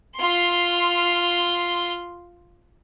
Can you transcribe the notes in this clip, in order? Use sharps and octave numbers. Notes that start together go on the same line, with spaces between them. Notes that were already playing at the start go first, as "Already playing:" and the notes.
F4 C6